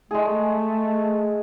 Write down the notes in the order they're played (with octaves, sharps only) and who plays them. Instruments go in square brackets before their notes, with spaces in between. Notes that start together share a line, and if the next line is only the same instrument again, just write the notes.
[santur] G#3 G#4 [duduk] A3